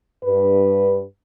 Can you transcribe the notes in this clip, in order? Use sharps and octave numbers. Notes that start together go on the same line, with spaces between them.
G2 B4